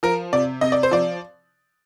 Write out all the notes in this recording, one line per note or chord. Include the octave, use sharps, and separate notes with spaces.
F3 A#4
C3 D5
C3 D#5
D5
C5
F3 D5